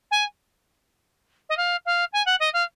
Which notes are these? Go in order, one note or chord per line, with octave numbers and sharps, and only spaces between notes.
G#5
D#5
F5
F5
G#5
F#5
D#5
F5